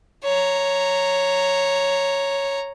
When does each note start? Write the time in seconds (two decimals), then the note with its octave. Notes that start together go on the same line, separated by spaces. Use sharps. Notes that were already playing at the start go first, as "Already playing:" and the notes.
0.24 C#5 A#5